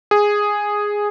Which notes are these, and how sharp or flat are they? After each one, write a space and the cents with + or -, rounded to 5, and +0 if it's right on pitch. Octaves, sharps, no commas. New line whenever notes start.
G#4 -5